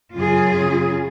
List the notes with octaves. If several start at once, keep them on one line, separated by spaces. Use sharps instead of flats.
F#2 C#3 F4 G#4